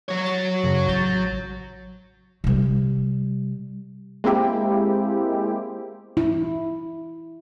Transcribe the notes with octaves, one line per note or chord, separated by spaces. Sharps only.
F#3 C#5
A6
F#2 C#3
A1 G6 A6
C3 G3
G#3 A#3 C4 E4 G4
E4